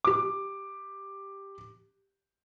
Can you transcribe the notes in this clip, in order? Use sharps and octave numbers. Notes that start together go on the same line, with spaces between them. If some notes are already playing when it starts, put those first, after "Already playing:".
G4 D6